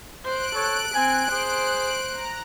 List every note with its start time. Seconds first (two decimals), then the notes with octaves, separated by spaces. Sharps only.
0.25 C5 F#6 D7
0.55 A4 C#5
0.95 C4 G#5
1.31 G#4 C5
2.11 A#5